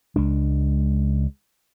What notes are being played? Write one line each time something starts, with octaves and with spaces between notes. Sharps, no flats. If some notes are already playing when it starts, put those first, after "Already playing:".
C#2 G#3 D4